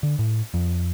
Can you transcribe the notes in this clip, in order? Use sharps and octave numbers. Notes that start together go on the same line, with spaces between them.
D3
A2
F2